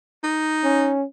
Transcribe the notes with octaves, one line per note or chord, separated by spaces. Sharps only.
D#4
C#4